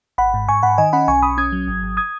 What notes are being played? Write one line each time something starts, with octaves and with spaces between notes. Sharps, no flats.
G#1 F#5 B5
G#2
G#2 G#5 C#6
G#2 F#5 B5
D#3 D#5 G#5
C#4 F#5 B5
B1 G#5 C#6
B1 B5 D#6
C#4 D#6 G#6
F#3
G#1
G#1
D#6 G#6